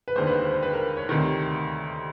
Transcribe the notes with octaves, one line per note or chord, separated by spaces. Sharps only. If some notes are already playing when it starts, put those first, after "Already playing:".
B4
E1 D#2 D3 C5
B4
C5
C5
B4
A#4
C#5
D2 C3 D#3